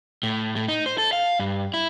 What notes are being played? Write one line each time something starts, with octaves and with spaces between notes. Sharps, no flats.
A2
A2
D#4
C5
A4
F5
G2
E4